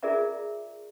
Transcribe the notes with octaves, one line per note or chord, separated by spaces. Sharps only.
F4 G#4 A#4 D5 E5 A#5